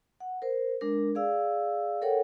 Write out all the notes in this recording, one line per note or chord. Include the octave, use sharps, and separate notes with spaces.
F#5
A#4 C5
G#3 D4 A#4
G#4 D5 F5 E6
A4 A#4 C#5 F#5 G5